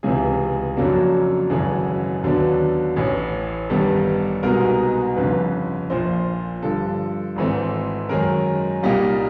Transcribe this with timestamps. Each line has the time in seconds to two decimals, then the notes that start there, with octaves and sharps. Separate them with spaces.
0.03 C#2 C3 E3 G#4
0.77 F2 C#3 F#3 A#3 D4 A4
1.50 G#1 F#2 C#3 E3 G#3 A4
2.23 D#2 D3 F#3 B3 D4
2.96 A1 A2 E3
3.70 A1 G2 D#3 G3 B3 A4
4.43 C2 B2 G#3 B3 D#4 A#4
5.16 G1 F2 C#3 B4
5.90 A#1 A#2 F3 C5
6.63 G2 D3 F3 A4
7.36 G#1 G#2 E3 A3 C4
8.09 F#2 D#3 G#3 C#4 A#4
8.83 C2 A#2 G3 A#3 D#4